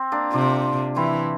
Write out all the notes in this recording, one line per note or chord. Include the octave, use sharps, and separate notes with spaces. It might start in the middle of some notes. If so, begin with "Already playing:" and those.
Already playing: C4
A#3 D4
C3 D4 F4
E3 C4 E4